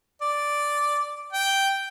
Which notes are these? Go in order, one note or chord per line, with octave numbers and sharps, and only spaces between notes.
D5
G5